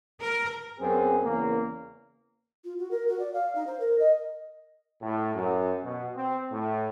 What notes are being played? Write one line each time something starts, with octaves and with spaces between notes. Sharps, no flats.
A#4
F#2 B3 C4 G#4
E2 C#3 A#3
F4
F#4
A#4
F#4
D5
F5
D#4
C5
A#4
D#5
A2
F#2
B2
C4
A2